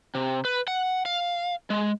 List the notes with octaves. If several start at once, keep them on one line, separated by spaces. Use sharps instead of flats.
C3
B4
F#5
F5
G#3